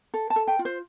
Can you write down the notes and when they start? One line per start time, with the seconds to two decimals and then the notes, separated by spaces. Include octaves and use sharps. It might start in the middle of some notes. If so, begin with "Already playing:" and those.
0.14 A4
0.30 A5
0.36 A4
0.48 G5
0.59 F4
0.65 C5